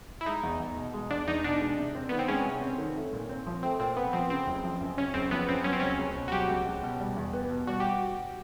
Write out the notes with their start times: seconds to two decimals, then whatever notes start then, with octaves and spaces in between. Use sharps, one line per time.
0.21 E4
0.26 G#3 D#4
0.43 E2
0.60 E2
0.77 B2
0.93 G#3
1.11 E2 D4
1.28 E2 D#4
1.44 B2 D4
1.61 G#3
1.77 C3
1.95 C4
2.09 D#3 B3
2.19 C4
2.28 G#3 C#4
2.45 C3
2.62 C4
2.78 D#3
2.95 A3
3.13 A#2
3.29 C4
3.46 F3
3.63 A3 C4
3.79 A#2 C4
3.96 B3 C4
4.13 F3 C4
4.30 C#3 C4
4.47 F#1
4.64 F3
4.81 F#2
4.97 C#3 C#4
5.14 F#1 C4
5.31 F3 B3
5.48 F#2 C4
5.64 F#3 C#4
5.73 C4
5.80 C#2 C#4
5.98 C#2
6.15 B2
6.28 F#4
6.32 F#3 G4
6.49 C#2
6.66 C#2
6.82 B2
6.99 G3
7.16 E2
7.33 B3
7.50 B2
7.67 G3 F#4
7.80 G4